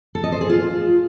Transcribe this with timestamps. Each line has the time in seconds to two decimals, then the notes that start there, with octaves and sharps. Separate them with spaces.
0.15 A4
0.24 D#5
0.32 C5
0.41 G#4
0.50 F4